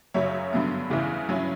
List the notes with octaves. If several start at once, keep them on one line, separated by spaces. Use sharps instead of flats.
F#2 C#3 F#3 C#5 E5
G2 D3 F#3 B3
E2 C#3 E3
G2 F#3 C#4 E4